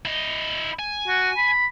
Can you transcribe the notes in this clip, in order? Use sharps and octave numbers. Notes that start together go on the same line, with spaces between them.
E4 D#5
G#5
F#4
B5